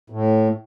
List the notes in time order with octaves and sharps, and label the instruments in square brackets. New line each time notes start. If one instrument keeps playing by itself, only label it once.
[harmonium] A2